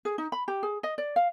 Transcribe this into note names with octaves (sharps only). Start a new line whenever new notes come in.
G#4
D#4
B5
G4
G#4
D#5
D5
F5